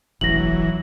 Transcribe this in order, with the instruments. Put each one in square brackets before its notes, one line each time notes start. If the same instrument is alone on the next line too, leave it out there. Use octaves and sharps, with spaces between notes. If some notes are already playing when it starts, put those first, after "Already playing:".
[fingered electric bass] E1 A1 [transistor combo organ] E3 F#3 [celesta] A#6 F#7